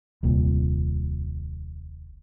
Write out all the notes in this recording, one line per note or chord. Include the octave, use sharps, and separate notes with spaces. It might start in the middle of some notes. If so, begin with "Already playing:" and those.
D#1 C2 A#2